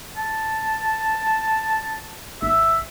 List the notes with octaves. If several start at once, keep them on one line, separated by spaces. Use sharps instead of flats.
A5
G#1 E5